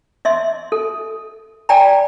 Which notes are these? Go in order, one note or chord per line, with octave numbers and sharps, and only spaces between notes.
D#5 E5 C6
A4
D5 G5 G#5 A#5 B5